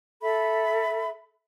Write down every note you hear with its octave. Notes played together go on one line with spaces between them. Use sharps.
A4 E5 B5